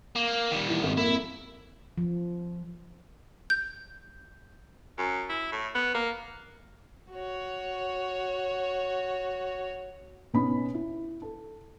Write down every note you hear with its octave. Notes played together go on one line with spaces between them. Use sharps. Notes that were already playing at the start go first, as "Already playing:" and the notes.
A#3
D#3 G3
E3
G#1
F2 A#3 E4
F3
G6
F#2
E4
A2
B3
A#3
F#4 C#5
B2 B3 C#4 D#4 B5
E4
A4